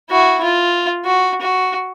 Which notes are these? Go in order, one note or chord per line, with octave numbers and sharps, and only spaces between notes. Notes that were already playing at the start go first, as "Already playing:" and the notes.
E4 F#4
F4
F#4
F#4